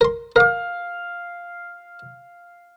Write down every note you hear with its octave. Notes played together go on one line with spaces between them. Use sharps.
A#4 C6
A#4 F5 D6